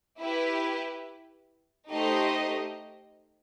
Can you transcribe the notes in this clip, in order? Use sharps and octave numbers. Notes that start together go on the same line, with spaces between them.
E4 G4 B4
A3 D#4 G4 C5 D#5